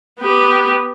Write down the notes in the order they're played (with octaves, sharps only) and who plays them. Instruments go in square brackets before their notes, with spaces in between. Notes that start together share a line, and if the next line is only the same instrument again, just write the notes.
[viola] B3 G4